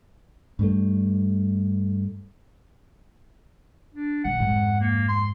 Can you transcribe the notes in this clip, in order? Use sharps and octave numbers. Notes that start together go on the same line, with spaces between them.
G2 G3 A3
D4
B2 D#3 F#5
F2 G#2
A#3
C6